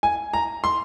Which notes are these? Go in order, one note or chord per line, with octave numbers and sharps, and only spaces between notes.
G#5
A#5
C6